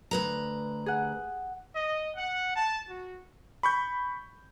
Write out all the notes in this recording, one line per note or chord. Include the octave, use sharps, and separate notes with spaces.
D2 B4 A#5
G#4 F#5
D#5
F#5
A5
F#4
B5 C#6 G6